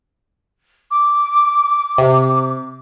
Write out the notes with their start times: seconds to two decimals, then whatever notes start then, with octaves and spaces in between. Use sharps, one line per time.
0.91 D6
1.98 C3